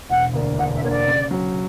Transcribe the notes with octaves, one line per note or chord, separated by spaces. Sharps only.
E1 F#5
D2 D3 A#3 D4
E1 F#5
E5
D2 D3 A#3 D4 C#5
D5
C#3
F#3 C#4